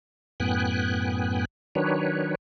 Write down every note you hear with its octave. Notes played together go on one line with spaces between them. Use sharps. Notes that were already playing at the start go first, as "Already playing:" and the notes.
F#2 A2 B3 G5 G#5 F#6
D#3 F#3 D4 B4 C#5